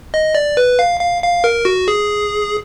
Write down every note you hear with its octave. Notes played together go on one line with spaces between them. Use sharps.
D#5
D5
B4
F5
F5
F5
A#4
F#4
G#4